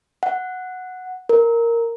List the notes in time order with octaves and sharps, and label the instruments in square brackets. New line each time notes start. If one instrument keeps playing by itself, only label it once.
[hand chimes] F#5
A#4